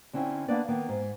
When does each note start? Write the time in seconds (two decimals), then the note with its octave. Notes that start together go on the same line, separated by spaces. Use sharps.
0.13 D3 C4 C#4 E4 F4
0.48 A#3 B3 D4 B4 D5
0.68 D#3 A#3 B3
0.89 G#2